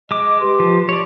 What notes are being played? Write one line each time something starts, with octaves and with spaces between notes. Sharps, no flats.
G#3 D#5 D6
G4 B4 C6
F3
C#5 D5